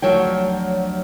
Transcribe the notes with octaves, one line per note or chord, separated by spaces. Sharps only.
D2 F3 F#3 C#5 G5